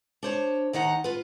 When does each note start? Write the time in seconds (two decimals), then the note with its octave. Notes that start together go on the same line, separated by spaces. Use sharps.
0.23 D4 C5 C#5
0.73 D#2 D#3 D#4 F#5 A#5
1.04 F4 B4